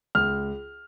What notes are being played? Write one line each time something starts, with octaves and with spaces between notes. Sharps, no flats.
C#2 F6